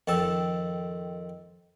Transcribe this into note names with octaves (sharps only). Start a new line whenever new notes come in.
F2 D#3 D#5 G5 A5 E6